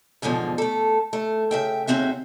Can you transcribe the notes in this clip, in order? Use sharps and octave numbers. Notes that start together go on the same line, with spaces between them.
E2 G#2 B2 D3 F3
A3 A4
A3
C#3 E5 G5
D#2 C#3 C4 F#4 E5